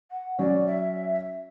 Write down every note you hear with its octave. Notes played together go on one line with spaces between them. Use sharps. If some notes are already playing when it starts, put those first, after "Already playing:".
F#5
F#3 C#4 D5
E5